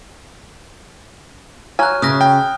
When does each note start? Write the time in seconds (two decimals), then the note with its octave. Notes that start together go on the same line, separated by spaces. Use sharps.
1.79 F#3 G#5 F6 F#6
2.02 C#3 E5 D#6 F#6 A#6
2.21 G5